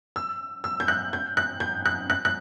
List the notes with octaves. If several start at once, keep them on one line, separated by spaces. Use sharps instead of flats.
E6
E6
G6
F#6
G6
F#6
G6
F#6
F#6
F#6